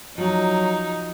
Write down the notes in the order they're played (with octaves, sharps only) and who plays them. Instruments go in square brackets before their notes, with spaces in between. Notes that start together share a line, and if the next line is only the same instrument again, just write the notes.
[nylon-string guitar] F3 F#4 [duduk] F#3 [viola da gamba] D#4